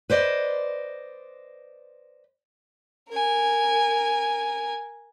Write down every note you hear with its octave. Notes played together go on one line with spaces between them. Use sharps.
B4 C5 D5 D#5
A#4 G#5